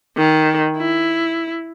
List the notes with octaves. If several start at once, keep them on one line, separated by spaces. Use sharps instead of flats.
D#3
E4